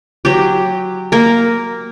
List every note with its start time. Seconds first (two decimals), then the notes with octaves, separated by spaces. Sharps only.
0.25 F#3 G4
1.12 A#3 A#4